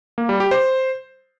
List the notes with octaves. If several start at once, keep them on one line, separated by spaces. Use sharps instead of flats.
A#3
G3
G4
C5